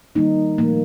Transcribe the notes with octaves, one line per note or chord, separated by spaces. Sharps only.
D#3 G3 A#3 D#4
A#2 F3 A3 A#3